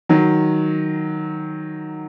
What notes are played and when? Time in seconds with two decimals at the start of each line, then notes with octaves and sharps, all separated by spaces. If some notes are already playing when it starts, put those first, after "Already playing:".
0.09 D#3 F#3